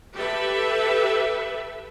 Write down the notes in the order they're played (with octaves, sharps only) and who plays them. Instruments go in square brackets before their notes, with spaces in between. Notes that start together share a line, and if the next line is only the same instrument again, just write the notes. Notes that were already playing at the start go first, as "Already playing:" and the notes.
[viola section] G4 A4 B4 E5